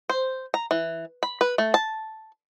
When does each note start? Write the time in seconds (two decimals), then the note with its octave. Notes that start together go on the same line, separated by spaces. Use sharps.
0.09 C5
0.54 A#5
0.71 E3
1.23 B5
1.41 B4
1.58 A3
1.74 A5